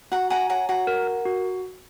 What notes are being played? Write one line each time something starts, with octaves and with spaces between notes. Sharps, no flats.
F#4 F#5 A#5
F#5 G#5 A#5
C#5 F#5 A#5
F#4 F#5 A#5
A#4
A#4
F#4